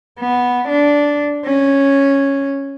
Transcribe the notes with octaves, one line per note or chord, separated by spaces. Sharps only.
B3
D4
C#4